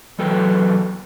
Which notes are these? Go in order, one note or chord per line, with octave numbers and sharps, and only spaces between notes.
E2 F#3 A4 B4 G5